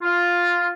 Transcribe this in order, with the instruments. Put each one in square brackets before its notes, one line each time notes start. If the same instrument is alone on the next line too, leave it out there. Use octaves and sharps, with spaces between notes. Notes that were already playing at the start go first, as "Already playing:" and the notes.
[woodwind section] F4